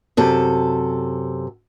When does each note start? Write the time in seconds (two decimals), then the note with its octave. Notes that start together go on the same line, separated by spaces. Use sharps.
0.17 F#2 C3 A4